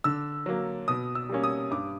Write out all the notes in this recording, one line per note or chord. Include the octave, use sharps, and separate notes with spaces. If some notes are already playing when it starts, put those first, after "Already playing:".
D3 E6
F#3 A#3
B2 D#6
E6
G3 A#3 C#4
D#6
G2 D6